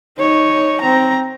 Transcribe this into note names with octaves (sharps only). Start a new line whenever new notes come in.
D#4 C#5
C4 A#5